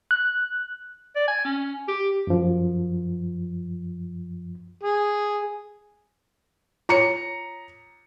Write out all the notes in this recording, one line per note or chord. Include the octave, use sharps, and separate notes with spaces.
F#6
D5
G#5
C#4
G4
F#2 F3
G#4
F4 C#5 A#5 C#7